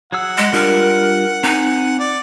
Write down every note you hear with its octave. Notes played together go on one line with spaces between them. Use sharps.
F#3 G#4 F#5 E6
G#3
G3 D4 F4 A#4
C4 D#4 G#5
D5